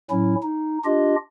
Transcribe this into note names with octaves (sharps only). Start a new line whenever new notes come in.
A2 F#3 C#4 E4
D#4
D4 F4 G4 D#5